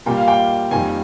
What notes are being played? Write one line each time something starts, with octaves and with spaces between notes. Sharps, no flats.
A#2 G3 A#3 G5
F5
G5
F2 D#3 G3 A#3 G#5